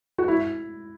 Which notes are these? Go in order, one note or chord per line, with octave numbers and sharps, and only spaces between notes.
F#4
E4